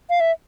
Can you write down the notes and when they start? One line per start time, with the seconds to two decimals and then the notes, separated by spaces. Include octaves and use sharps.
0.10 F5
0.20 E5